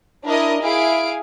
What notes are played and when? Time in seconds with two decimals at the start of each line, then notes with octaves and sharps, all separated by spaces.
0.25 D4 E4 A#4 D#5
0.62 E4 G#4 F5 G#5 D7